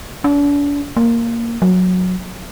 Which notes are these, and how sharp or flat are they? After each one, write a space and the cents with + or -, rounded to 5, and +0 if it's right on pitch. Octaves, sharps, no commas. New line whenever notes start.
D4 -40
A#3 -5
F#3 -15